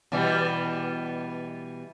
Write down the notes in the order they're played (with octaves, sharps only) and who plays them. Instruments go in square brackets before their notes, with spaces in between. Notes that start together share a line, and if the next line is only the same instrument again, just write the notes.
[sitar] B2 E3 G3